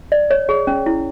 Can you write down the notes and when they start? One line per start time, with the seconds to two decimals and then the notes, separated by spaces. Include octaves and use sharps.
0.12 D5
0.31 C#5
0.49 G#4
0.67 C#4
0.86 E4